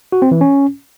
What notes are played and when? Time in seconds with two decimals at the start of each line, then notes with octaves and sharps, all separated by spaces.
0.12 F#4
0.22 C4
0.31 E3
0.41 C#4